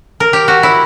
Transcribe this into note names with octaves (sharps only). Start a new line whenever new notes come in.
A#4
G4
F#4
E4